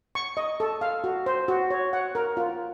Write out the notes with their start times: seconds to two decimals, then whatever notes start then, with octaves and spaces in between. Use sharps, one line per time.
0.15 C#6
0.37 D#5
0.60 A4
0.81 F5
1.04 F#4
1.26 C5
1.48 F#4
1.70 C#5
1.93 F#5
2.15 A#4
2.37 F4